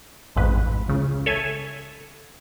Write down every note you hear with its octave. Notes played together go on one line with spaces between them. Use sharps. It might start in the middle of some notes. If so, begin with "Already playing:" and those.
A1 F2 G#2 B4
C#2 C#3
A4 C#5 E5 G#5 G#6